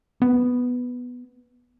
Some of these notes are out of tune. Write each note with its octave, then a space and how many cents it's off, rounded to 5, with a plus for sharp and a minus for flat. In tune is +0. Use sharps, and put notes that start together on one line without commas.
B3 +0